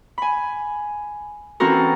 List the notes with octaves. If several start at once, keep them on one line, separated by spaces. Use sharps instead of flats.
G#5 B5
E3 C4 C#4 F#4 A4 A#4